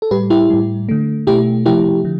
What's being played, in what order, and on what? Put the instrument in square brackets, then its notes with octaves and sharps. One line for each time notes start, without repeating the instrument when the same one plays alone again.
[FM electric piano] A4
A2 G3 G4 B4
E4 G4
A2 G3
D3 A3
B2 A3 E4 G4
C3 F3 A3 E4 G4
D3 F3